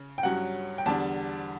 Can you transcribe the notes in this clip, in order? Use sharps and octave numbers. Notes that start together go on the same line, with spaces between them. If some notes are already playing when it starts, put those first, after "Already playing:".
Already playing: C#3
G5
G2 F#3 C#4 F#5
G5
E2 D3 G3 D4 A5